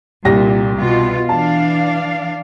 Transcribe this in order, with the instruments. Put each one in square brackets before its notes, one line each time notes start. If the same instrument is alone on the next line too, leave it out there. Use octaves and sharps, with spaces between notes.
[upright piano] C2 G4 A#6 [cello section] A#2
[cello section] B2 F4
[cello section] E3 D4 F5 [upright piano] A5